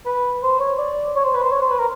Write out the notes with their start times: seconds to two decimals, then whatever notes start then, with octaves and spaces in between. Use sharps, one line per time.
0.05 B4
0.43 C5
0.60 C#5
0.78 D5
1.16 C#5
1.24 C5
1.34 B4
1.42 C5
1.51 C#5
1.61 C5
1.71 B4
1.79 A#4